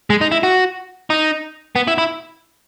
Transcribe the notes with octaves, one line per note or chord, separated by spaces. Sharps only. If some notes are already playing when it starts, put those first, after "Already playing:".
G#3
D#4
E4
F#4
D#4
B3
E4
E4